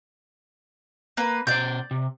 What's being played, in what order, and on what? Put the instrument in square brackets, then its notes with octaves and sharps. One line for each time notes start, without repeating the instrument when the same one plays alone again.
[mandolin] A#3 B4
[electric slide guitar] B2 C5 [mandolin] D5 G6
[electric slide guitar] C3